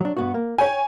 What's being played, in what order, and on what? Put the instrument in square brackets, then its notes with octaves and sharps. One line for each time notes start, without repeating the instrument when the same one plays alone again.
[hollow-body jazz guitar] F#3 D4
G2 B3 F#4
A#3
[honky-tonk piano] C#5 G#5 [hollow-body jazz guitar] G5